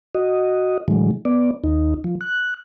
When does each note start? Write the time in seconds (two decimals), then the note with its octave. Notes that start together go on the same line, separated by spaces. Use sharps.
0.15 F#4 D#5
0.88 A2 D3 E3 F#3 G#3
1.25 B3 D5
1.64 D#2 D#4
2.04 F3
2.21 F#6